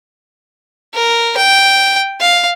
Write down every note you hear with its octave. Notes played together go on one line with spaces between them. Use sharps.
A#4
G5
F5